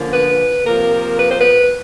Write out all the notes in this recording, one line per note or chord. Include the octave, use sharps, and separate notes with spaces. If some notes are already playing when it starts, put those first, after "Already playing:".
Already playing: D3 F3 A#3 C#4
B4
C3 F3 A#3 A#4
B4
C5
B4